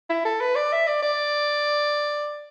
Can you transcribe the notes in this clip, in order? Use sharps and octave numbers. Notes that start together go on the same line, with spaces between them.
E4
A4
B4
D5
E5
D5
D5